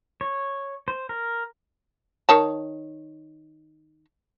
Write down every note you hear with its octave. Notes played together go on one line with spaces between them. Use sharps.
C#5
C5
A#4
D#3 C#5 A5